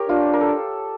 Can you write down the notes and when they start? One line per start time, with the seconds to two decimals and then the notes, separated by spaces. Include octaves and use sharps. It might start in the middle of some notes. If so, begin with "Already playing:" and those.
Already playing: G4 A#4 C#5
0.09 D4 F4
0.33 A#4
0.41 A4